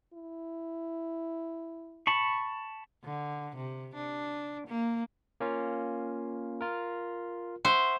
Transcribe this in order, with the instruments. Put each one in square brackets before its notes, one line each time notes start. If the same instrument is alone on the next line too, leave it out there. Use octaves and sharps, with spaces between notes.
[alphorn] E4
[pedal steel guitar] A5 B5 C#6
[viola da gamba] D3
C3
D4
A#3
[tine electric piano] A#3 C#4 F4
F4 A#4
[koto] C5 [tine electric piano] E5 F#5 C#6